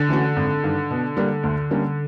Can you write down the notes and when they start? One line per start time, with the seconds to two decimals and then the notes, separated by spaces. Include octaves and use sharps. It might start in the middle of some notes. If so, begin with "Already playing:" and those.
Already playing: D3
0.09 E3 A3 C#4 F#4
0.36 G#1
0.64 G2 D#3
0.90 B2
1.17 G3 A#3 D4
1.43 D2
1.71 D3 G3 A#3 C#4